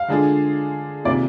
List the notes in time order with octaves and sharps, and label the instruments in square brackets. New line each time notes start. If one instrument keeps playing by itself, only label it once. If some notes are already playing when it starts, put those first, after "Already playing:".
Already playing: [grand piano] F5
[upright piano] D3 G#3 D4 F4 G#4
[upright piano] C3 D#3 A#3 F4 G#4 [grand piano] D5